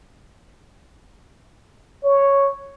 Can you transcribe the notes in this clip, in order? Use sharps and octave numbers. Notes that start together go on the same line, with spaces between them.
C#5